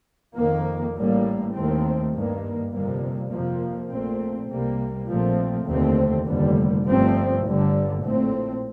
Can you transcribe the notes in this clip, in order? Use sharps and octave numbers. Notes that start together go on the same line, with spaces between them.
F2 D#3 A#3
A1 A2 G3 A#3
D#2 D#3 A3 C4
G2 D#3 A#3
G1 F2 C3 G3 A#3
F2 C3 F3 A#3
A#1 A#2 A3 C4
C2 C3 G3 A#3
A#1 A#2 F3 A3 C4
F1 D#2 D3 A3 C4
F1 D#2 D3 G3
G1 G2 F3 A3 C4
G1 G2 D3 G3
A#1 A2 A3 C4